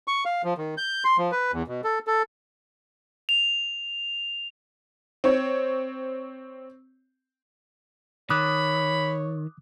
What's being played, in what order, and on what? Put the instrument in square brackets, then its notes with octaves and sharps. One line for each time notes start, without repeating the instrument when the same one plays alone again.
[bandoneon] C#6
F5
F3
D#3
G6
C6
F3
B4
E2
B2
A4
A4
[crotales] F7
[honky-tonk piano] C4 C#5
[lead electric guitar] D#3 [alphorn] C#5 [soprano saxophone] B5 [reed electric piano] D6 D#6 F#6